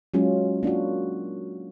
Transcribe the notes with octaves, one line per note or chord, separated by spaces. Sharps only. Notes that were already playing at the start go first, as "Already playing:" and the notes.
F#3 G#3 C#4 F4 G#4
A#3 D4 F4 F#4